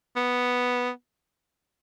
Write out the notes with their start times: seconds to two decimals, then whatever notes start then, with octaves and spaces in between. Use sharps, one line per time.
0.16 B3